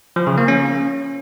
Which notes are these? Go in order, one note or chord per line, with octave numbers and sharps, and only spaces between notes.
F3
C#3
A#3
C#4